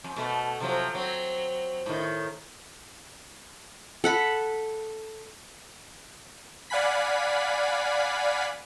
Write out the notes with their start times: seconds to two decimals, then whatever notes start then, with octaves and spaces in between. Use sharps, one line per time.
0.04 F2
0.16 B2 A3
0.60 C3 F3 F#3
0.95 F#3 C4
1.86 A2 D#3
4.04 A4 F#5 B5
6.70 D5 F5 F#5 G#5 B5 B6